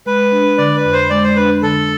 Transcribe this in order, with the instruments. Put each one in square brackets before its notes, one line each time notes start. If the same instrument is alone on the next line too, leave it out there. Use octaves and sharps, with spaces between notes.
[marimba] G#3 [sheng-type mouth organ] B4
[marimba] D4
[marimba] D3 [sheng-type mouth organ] D5
[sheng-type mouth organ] B4
[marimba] F2
[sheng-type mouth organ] C5
[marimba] G#3 [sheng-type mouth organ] D5
[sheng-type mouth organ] C5
[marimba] D4 [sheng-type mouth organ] B4
[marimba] D3 [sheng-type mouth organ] A4